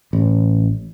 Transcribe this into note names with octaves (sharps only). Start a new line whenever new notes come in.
A1